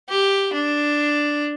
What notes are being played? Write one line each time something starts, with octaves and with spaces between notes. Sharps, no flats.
G4
D4